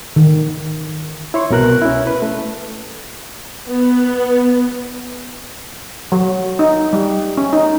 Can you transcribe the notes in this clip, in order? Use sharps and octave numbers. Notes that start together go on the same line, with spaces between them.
D#3
E4 C#5 C6 C#6
C2 B2 A#4 F#6
C#4 E4
B4
A3
B3
F#3
D#4
G3
C#4
D#4